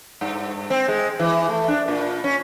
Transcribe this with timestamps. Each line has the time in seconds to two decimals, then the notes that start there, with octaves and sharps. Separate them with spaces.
0.21 G2
0.70 C4
0.88 G#3
1.19 E3
1.49 A3
1.68 D4
1.88 A#2
2.24 C#4